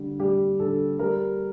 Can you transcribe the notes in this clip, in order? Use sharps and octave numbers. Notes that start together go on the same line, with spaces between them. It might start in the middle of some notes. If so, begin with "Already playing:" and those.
Already playing: D3 G3
G3 G4
D3 A4
G3 A#4